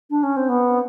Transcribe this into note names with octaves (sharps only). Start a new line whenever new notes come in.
D4
C#4
C4
B3